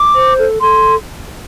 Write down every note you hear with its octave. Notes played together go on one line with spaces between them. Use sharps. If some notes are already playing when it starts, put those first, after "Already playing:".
Already playing: D6
C5
A4
A4 C6